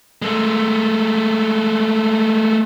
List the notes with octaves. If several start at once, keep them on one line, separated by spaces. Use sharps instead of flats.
G#3 A3